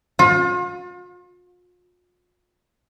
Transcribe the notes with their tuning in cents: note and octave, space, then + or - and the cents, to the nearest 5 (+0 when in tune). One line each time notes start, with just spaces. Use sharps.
F4 +40